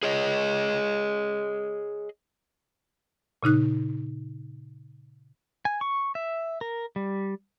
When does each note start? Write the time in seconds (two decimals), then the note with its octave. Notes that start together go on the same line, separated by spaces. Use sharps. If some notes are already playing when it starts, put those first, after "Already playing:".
0.03 G#4 C#5 D#5
3.43 A#2 C#3 D#4 F#6
5.65 G#5
5.81 C#6
6.15 E5
6.61 A#4
6.96 G3